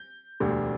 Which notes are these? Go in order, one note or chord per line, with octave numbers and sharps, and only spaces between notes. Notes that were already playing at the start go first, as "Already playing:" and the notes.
Already playing: G6
E1 D2 D3 G3